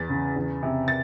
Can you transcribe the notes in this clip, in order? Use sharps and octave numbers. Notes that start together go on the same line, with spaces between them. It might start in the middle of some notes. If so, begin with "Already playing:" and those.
Already playing: E2 A6
C#3
E2
C3
A6